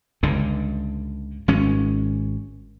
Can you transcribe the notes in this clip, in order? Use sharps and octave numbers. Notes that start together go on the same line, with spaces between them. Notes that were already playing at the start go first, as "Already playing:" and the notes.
C#2 G2 D3
G#1 G#3 C#4